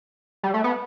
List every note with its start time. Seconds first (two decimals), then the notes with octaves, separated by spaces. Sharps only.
0.43 G3
0.54 A3
0.64 B3